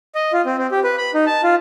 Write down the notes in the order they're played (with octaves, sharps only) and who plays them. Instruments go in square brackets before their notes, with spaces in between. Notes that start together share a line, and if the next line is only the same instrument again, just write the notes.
[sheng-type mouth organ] D#5
F4
C4
C4
G4
B4
B5
D#4
A5
F4